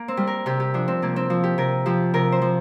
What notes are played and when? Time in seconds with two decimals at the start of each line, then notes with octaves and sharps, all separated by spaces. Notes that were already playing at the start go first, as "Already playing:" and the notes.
Already playing: A#3
0.08 C4
0.17 G3
0.27 A#4
0.46 C3 G4
0.60 G4
0.74 F3 D4
0.88 C4
1.02 C3 A#3
1.16 C4
1.30 F3
1.43 G4
1.58 C3 A#4
1.86 F3 G4
2.14 C3 A#4
2.32 C5
2.42 F3